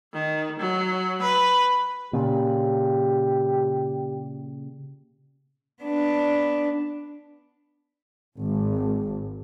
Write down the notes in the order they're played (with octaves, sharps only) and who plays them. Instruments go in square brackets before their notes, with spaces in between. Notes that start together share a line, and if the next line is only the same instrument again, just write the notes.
[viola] D#3
F#3
B4
[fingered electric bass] A#2 C#3 [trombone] G4
[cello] B3 D4
[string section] G#1